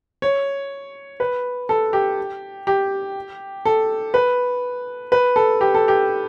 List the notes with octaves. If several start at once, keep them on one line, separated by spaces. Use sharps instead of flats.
C#5
B4
A4
G4
G4
A4
B4
B4
A4
G4
A4
G4